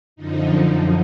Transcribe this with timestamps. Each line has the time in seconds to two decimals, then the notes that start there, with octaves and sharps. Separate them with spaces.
0.16 F#2 D3 F3 D#4